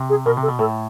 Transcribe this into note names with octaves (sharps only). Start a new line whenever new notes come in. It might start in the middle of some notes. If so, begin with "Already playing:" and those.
Already playing: C3
G#4
B2 A#4
C3
A4
B2
A2 A4